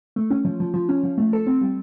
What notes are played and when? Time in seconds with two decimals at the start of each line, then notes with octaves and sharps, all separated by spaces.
0.16 A3
0.30 C#4
0.45 F3
0.60 F3
0.74 F3
0.89 C#4
1.03 F3
1.18 A3
1.33 A4
1.46 C4
1.61 G3